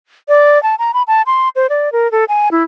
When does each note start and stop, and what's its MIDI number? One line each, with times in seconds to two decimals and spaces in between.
0.28 0.61 74
0.63 0.75 81
0.79 0.92 82
0.94 1.03 83
1.07 1.22 81
1.26 1.49 84
1.56 1.67 72
1.70 1.92 74
1.92 2.10 70
2.12 2.25 69
2.28 2.49 80
2.51 2.63 64